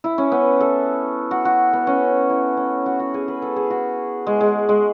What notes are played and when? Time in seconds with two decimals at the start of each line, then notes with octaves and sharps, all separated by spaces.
0.04 E4
0.18 C#4
0.32 B3
0.60 A4
1.31 F#4
1.45 F#4
1.73 B3
1.87 C#4
2.30 E4
2.57 C#4
2.86 F#4
3.00 F#4
3.14 G#4
3.28 B4
3.42 A4
3.56 G#4
3.70 F#4
4.27 G#3
4.40 G#3
4.69 G#3